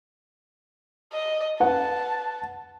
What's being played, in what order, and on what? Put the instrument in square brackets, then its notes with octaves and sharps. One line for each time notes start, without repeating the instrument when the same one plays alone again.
[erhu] D#5
[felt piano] B4 F#5 [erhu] A5